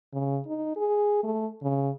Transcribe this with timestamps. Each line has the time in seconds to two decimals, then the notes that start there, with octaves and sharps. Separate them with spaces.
0.13 C#3
0.47 D#4
0.76 G#4
1.23 A3
1.62 C#3